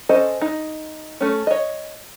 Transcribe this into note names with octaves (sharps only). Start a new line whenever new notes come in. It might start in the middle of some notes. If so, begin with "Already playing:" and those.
C#4 A4 C5 D#5
D#4
A3 C#4
C#5 D#5